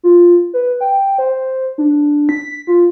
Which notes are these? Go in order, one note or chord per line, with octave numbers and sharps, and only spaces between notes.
F4
B4
G5
C5
D4
B6
F4